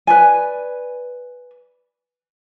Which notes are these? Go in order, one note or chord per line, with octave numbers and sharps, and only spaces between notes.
B4 D5 G#5